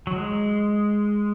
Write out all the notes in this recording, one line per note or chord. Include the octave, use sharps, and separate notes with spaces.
F#3
G#3